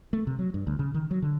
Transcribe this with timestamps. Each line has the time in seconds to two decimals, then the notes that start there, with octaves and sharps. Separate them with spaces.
0.13 A3
0.27 C3
0.39 F#3
0.54 G2
0.67 D2
0.79 C#3
0.94 D#3
1.11 F#3
1.22 D3